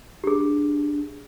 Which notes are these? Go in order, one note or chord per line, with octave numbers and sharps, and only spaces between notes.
D4 G4 G#4